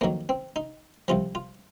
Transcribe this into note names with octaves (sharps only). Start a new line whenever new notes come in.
F2 D#3 F#3 A#3
C4
D#4
C2 C3 F3 F4
F4